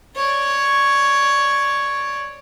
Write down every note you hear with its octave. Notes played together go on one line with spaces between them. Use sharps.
C#5 D5